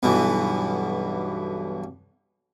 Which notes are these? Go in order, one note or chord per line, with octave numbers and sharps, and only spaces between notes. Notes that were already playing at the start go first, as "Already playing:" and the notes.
B1 G2 B2 E3